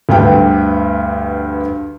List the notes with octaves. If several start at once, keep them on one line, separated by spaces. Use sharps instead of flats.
D2 G2 B4 G5